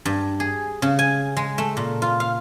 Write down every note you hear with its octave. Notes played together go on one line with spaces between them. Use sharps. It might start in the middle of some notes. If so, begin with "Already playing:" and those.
G2
G#4
C#3
G#5
G#3
A3
A#2
F4
F5